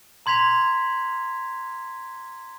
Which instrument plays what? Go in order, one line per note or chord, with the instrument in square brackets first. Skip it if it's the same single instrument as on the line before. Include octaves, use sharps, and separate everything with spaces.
[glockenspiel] A#5 C6 G#6 B6 F7